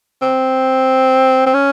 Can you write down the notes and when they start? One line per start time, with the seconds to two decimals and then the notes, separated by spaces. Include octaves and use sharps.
0.22 C4
1.46 C4
1.54 C#4